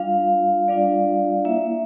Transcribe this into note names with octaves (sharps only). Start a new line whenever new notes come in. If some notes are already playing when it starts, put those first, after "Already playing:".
Already playing: G3 D4 F4 F5
G3 D4 F4 D5
A#3 E4 E5